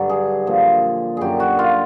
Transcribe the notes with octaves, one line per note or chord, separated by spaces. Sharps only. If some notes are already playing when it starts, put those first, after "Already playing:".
Already playing: G2 D3 F#3
G#4
A#2 F3
F#2 D3 F#3 G4 G#4
F#4
F4